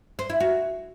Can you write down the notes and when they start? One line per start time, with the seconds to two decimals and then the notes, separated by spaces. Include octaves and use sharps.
0.19 C5
0.30 E4
0.40 F#4